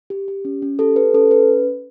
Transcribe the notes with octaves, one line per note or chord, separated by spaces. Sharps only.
G4
G4
C#4
C#4
G4 A4
G4 B4
C#4 A4
C#4 B4